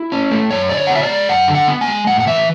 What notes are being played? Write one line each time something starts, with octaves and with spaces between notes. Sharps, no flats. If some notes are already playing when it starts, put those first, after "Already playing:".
Already playing: E4
C#4
A3
F#2 C#5
D3 D5
C#5
F#5
B3
E5
D5
G#3
F#2 F#5
D3
F#5
B3
G#5
G#3
A2 F#5
F#5
E3 E5